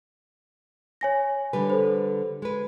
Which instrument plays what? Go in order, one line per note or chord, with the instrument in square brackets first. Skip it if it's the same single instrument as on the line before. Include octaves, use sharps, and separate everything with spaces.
[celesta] C#5 G#5 A#6
[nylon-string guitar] D3 G3 B4
[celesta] A4 C5
[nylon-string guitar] G#3 B4